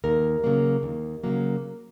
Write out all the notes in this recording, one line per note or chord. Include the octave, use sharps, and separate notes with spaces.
D#2 A#4
C#3 F#3 A#3
D#2
C#3 F#3 A#3